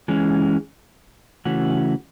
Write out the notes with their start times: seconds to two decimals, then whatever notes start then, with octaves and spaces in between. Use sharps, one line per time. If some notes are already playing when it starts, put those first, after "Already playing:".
0.08 E3 G#3 C#4
1.45 C#3 E3 A3 C#4 F#4